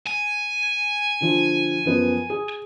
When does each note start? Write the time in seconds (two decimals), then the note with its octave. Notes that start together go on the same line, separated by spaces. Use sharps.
0.06 G#5
1.21 D3 F3
1.85 F#2 F3 B3
2.30 G#4